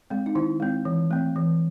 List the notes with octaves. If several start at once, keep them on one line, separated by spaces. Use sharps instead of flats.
G#3 C4
D#4
D#3 E4
G#3 C4
E3
A3 C4
E3